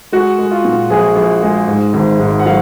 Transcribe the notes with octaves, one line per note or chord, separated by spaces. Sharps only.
G#3 F#4
G#3
F4
A#2
A#1 G#4
A#1
G#3
G#2
G#1
G#2
F#5
F#3 F5